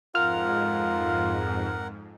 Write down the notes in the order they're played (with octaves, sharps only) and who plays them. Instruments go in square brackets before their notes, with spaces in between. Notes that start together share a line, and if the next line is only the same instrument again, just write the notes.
[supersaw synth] F2 G#2 [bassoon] F4 [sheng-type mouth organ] A#4 F#5 [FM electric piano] F6